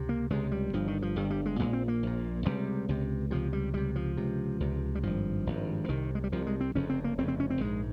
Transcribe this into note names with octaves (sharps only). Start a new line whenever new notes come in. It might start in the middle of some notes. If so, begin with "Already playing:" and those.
Already playing: C#2 C3
A#3
C#2 C3 G#3
G3
G1 G2 F3
D#3
F3
G1 G2 G3
G3
G#3
A#1 A#2 G#3
C4
A#3
A#1 A#2
C#2 C3 G3
C#2 C3
C#2 C3 F3
G3
C#2 C3 G3
F3
C#2 C3
C#2 C3
G3
G#1 G2 F3
G#1 G2
F3
C2 C3 D#3
G#3
G3
C2 C3 F3
G#3
C4
F1 F2 C#3 C#4
C4
A#3
F1 F2 C#3 C4
C4
C#4
C4
A#1 G#2 G#3